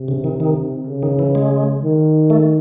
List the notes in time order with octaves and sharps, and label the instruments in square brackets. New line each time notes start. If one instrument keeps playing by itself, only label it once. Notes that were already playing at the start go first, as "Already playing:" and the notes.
Already playing: [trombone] C3
[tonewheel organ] C#3
D#3
D#3
[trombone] C#3
[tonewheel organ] D#3
E3
G#3
[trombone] D#3
[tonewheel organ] A3